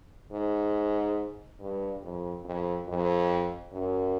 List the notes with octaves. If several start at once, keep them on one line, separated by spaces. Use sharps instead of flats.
G#2
G2
F2
F2
F2
F#2